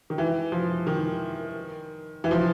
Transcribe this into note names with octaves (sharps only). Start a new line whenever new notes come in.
D#3
E3
F3
D#3
E3
F3